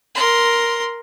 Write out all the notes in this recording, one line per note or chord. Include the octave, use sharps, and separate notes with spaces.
A#4 C6